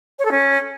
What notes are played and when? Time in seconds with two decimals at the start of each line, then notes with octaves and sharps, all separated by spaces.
0.19 C#5
0.25 A4
0.31 C#4